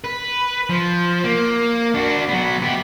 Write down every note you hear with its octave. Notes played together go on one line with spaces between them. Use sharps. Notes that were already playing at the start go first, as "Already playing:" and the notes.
B4
F3
A#3
D4 F#4
F#3 B3
B3 G4